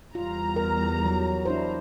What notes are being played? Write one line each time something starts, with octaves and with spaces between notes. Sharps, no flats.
E2 G3 F4 A#5
A#4
F#3
D4 E4 C5